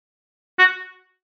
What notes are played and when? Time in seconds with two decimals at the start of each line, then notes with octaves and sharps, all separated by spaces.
0.59 F#4